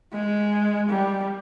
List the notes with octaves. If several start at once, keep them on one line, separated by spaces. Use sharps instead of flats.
G#3
G3